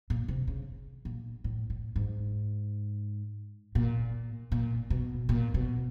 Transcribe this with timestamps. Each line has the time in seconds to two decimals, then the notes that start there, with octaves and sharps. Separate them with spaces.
0.10 A#2
0.28 C3
0.48 C#3
1.05 A#2
1.44 A2
1.70 A2
1.96 G#2
3.75 A#2
4.52 A#2
4.90 B2
5.29 A#2
5.54 B2